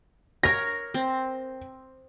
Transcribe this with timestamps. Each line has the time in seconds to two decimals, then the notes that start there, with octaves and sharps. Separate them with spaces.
0.43 A#4 C#5 A#6
0.94 C4